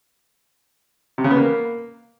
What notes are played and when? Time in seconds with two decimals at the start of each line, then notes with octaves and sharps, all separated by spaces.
1.18 C3
1.24 C#3
1.30 B3
1.37 A#3